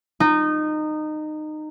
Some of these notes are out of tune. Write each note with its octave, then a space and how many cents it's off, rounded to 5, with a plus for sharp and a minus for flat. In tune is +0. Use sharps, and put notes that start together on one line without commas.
D#4 -20